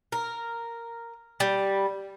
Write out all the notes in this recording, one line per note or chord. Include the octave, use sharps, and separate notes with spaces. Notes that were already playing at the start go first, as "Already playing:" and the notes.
A#4
G3